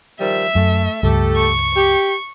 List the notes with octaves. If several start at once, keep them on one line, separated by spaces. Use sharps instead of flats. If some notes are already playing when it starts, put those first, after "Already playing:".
D#3 F3 G3 E5
F#2 A3
C#2 G2 A3 G4 A4
C#6
G4